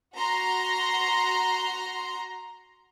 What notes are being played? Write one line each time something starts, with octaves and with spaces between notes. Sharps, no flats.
F#4 A#5 C6